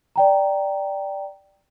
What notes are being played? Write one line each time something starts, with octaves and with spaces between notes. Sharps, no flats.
D5 G5 A#5